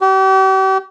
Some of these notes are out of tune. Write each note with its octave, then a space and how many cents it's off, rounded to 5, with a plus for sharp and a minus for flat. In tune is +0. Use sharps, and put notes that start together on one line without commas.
G4 -40